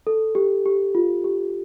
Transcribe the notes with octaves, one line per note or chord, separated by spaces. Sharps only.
A4
G4
G4
F4
G4